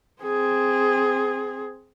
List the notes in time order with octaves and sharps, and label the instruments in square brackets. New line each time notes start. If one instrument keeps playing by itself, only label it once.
[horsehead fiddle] C4 G#4